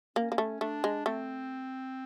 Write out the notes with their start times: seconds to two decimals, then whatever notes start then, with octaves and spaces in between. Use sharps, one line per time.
0.16 A#3 C#4
0.32 A#3
0.38 A3
0.61 A3 D4
0.84 G#3
1.06 A3 C4